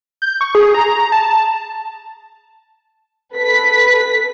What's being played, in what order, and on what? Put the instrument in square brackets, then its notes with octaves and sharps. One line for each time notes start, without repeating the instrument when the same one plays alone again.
[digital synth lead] G6
C#6
G#4
A#5
A5
[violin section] A4 B4 B6